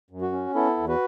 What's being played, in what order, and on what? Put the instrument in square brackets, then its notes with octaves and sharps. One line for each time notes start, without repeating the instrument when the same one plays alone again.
[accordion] F#2
F#4
C#4
B3 E4 A4
E2
F#4 B4